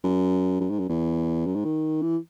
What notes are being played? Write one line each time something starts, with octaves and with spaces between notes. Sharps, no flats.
F#2
F#2
G#2
F#2
E2
F#2
G#2
D#3
E3